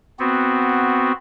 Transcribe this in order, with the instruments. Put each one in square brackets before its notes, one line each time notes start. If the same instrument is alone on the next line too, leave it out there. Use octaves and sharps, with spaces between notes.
[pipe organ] B3 C4 F#4